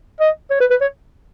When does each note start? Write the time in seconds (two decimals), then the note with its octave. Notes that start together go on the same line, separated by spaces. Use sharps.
0.20 D#5
0.50 C#5
0.60 B4
0.70 B4
0.81 C#5